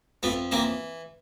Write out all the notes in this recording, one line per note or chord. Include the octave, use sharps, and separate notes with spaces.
F2 A3 B3
E3 A#3 C4